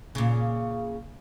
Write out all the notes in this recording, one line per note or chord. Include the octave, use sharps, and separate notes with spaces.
A#2 C#3